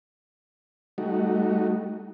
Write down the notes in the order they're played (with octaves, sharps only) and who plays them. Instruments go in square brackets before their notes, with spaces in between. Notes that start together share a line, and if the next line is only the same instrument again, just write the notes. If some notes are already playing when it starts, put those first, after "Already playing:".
[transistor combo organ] G3 A3 D#4 F#4